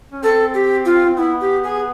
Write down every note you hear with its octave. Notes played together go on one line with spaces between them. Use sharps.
C#4
C4 A4
G4
F4
C4
B3 E4
G4
G#4